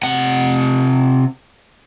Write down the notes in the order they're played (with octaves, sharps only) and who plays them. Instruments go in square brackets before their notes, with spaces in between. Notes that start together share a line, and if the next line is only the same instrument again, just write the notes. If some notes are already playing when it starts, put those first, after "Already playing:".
[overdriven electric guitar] C3 F#5